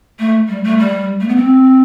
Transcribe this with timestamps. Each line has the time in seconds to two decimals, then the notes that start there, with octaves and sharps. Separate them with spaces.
0.19 A3
0.48 G3
0.64 A3
0.78 G3
1.21 A3
1.28 B3
1.36 C4